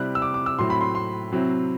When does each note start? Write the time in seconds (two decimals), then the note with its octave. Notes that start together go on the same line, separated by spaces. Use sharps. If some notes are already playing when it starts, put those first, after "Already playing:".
Already playing: C3 G3 C4 E4 F#6
0.15 E6
0.22 D6
0.34 D6
0.46 E6
0.59 A2 F#3 C4 E4 C6
0.70 B5
0.81 C6
0.95 C6
1.32 C3 F#3 C4 E4